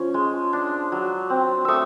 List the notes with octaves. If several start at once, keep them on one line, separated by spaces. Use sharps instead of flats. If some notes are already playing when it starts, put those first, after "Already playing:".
Already playing: F3 C#4
G#3
D4
F#3
C4
A3 C#6 D#6 E6